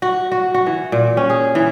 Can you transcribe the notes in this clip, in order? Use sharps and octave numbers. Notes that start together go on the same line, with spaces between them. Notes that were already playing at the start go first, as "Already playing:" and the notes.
F#4
F#4
F#4
E3
A#2
C#4
G#4
E3